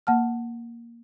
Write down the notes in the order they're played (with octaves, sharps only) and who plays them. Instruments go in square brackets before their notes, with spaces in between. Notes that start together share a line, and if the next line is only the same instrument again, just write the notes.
[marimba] A#3 F#5 A5 F6